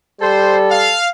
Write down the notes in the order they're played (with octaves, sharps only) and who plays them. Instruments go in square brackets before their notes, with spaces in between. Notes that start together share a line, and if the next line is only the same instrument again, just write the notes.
[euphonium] G3 [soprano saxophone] A4 [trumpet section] C5
[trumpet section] F5